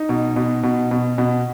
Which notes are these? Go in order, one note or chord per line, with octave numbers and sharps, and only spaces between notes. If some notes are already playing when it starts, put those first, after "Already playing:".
Already playing: D#4
B2
B2
B2
B2
B2